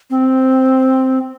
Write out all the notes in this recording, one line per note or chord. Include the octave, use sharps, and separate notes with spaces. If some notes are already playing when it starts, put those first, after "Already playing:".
C4